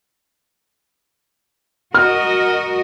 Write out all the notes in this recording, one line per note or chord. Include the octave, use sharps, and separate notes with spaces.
F#4 A#4 D#5 F6